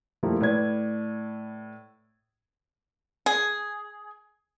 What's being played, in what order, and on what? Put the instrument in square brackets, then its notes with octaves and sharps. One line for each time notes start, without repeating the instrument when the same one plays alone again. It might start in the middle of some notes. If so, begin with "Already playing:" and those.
[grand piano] F3 G3 A3 A#3 E4
A2 B4 D5 G#6
[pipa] G#4